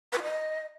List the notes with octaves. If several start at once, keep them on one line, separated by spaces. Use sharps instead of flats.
B4
F4
D#5